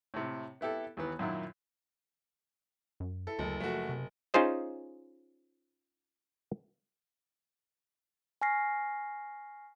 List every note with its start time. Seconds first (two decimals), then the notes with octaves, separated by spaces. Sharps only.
0.14 A2 C3
0.61 B3 E4 G4 A4
0.97 D#2 E3 B3
1.19 F#2 A#2 D#3 E4
3.00 F#2
3.27 E4 A4
3.39 F#1 D2
3.60 F3 A3 F#4
3.89 C3
4.34 C#4 D#4 F4 G#4 C5 D#5
8.42 G#5 C#6 F6 A#6 C7